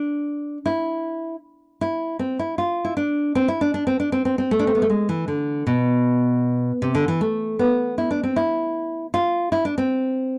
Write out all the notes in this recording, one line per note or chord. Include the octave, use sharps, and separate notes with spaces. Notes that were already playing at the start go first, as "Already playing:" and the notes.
Already playing: D4
E4
E4
C4
E4
F4
E4
D4
C4
E4
D4
D4
C4
D4
C4
C4
C4
A3
D4
C4
B3
A3
G#3
E3
D3
B2
C3
D3
E3
A3
B3
E4
D4
C4
E4
F4
E4
D4
C4